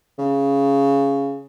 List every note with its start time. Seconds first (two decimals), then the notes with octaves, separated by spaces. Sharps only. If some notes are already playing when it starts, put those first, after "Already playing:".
0.18 C#3